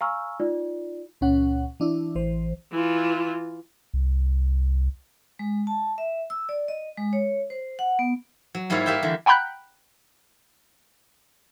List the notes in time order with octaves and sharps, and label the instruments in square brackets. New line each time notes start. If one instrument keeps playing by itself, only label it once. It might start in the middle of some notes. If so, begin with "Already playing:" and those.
[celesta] F5 G#5 A#5 C#6 E6 F6
D#4 F4 D5
[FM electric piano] C#2 A#2 C#4 F#5
E3 D4 E4
A1 E3 C5
[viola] E3 F4
[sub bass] C2
[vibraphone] G#3
A5
E5
E6
D5
D#5
G#3
C#5
C5
F#5
B3
[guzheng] F#3
G#2 G3 A#3 E4 F4 C#5
A#3 G4 E5 F5 G5
D3 E3
[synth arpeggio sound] F#5 G5 A#5 B5 F#6 G6